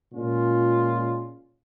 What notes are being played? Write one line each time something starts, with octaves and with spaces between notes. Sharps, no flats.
A#2 G#3 C#4 F4